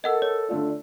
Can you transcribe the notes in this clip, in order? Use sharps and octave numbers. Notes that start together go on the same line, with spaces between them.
A4 A#4 D#5 F#5 E6
C#5
D3 A3 F4 D5